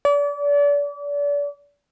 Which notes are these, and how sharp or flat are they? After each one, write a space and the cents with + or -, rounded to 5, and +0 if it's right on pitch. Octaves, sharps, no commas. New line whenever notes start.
D5 -35